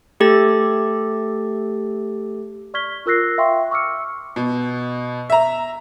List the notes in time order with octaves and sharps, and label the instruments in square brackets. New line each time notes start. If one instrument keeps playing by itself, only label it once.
[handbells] A3 G4 A4 A6
[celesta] D5 C#6 F6 G#6 B6 G7
F4 A#4 E6 F#6 A#6 C7
E5 F5 G5 C6 C#6
C#6 D6 E6 F6 C#7
[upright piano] B2
E5 A#5